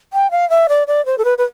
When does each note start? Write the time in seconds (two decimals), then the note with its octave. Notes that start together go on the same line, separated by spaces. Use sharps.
0.13 G5
0.31 F5
0.50 E5
0.69 D5
0.87 D5
1.06 C5
1.18 A4
1.25 B4
1.38 B4